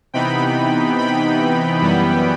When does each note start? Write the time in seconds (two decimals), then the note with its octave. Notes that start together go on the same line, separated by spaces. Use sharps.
0.14 C3 E3 B3 D#4 G5 B5
0.99 G5 B5
1.82 F#2 E3 G3 B3